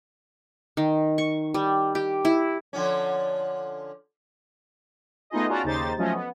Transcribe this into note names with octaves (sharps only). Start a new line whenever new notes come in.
D#3
C#6
G3
G4
E4
D3 F3 C#4
A3 B3 D#4 F4 G#4 D#5
C#4 F4 F#4 D5 A5 A#5
D#2 C#3 D#4 G4 C5 A6
F3 F#3 A3 C#4 D#5
B3